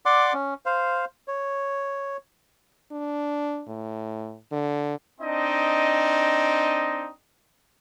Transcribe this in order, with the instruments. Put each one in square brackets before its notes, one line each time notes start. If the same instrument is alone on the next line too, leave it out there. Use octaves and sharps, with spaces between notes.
[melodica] D5 F#5 C6 D6
C#4
C5 F5
C#5
[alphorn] D4
A2
D3
[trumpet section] C4 D4 D#4 D#5